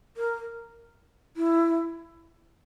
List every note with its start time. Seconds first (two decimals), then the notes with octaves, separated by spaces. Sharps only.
0.17 A#4
1.37 E4